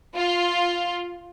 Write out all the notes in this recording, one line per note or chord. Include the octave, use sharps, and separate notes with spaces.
F4